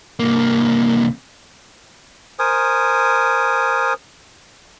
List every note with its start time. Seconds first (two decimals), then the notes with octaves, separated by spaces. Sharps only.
0.20 C2 A#3
2.39 A#4 C5 G#5 D#6